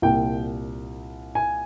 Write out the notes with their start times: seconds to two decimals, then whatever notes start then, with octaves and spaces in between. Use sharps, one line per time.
0.02 C2 A#2 G5
1.35 G#5